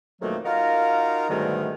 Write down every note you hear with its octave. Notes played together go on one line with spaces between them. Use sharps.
F2 B2 D#3 F#3 A3 A#3
D#4 F4 F#4 A#4 F5 A#5
G#2 B2 D3 D#3 G3 A3